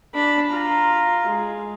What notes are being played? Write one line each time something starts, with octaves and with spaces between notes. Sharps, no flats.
D4 B5
F4 A#5
G#3